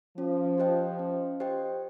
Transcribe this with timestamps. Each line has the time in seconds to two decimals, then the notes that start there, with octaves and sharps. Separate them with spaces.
0.18 F3 C#4
0.58 G4 C5 D#5 G5
0.99 C#4
1.40 G4 C5 D#5 G5